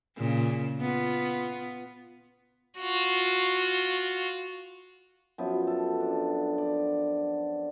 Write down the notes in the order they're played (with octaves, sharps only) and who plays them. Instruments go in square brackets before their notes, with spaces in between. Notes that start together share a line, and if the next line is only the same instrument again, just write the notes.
[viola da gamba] A#2 C#3
B3 F4
[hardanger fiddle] F4 F#4
[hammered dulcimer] F#2 F3 B3
A4
D4
D5